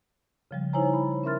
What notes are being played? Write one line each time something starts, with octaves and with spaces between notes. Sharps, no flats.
C#3 F3 G3
D#4 E4 C5 C#5 G#5 A#5
B5
C#4 A#4 E5 C6 F6 A6